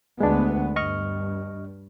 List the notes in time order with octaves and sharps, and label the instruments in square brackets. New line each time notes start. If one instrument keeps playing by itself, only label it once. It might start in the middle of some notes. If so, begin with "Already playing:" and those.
[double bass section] D2 B3 [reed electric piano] G#3 D4
[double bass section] G2 [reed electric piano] D#5 C#6 F6